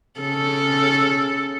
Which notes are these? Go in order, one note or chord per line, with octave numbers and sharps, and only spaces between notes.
C#3 A4